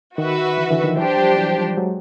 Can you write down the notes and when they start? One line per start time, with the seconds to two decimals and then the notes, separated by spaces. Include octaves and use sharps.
0.18 D#3 F#4 B4 E5
0.58 D3 E3
0.71 D3 E3
0.84 D#3 F3
0.97 E3 F#3 D4 G4 C5
1.17 F3 G3
1.37 E3 F#3
1.57 F3 G3
1.78 F#3 G#3